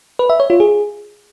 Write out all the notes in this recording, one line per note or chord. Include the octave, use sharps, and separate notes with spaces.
B4
E5
C#5
F4
G#4